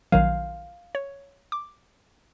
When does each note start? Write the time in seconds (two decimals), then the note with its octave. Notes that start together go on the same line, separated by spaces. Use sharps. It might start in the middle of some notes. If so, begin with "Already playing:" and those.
0.12 A#1 D#3 F#3 F5
0.95 C#5
1.52 D6